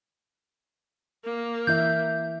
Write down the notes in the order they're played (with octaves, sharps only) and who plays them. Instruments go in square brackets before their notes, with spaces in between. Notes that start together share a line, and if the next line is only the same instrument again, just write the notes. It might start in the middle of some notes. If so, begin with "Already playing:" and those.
[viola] A#3
[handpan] E3 E4 E5 [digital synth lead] G6